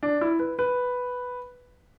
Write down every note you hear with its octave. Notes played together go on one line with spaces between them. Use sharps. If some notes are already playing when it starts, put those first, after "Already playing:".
D4
E4
B4
B4